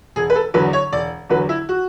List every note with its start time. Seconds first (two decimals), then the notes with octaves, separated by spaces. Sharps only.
0.16 E1 G#4
0.30 B4
0.36 A4
0.54 E2 D3 F#3 B4
0.73 C#5
0.92 E1 D5
1.30 E2 D3 F#3 B4
1.49 E4
1.69 F#4